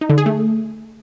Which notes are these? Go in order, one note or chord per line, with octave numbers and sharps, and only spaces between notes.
D#4
D3
G#4
A3